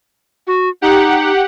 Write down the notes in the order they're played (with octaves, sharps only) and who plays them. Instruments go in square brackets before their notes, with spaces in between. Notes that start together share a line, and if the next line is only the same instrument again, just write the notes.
[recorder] F#4
[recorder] D#4 [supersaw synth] G4 F#5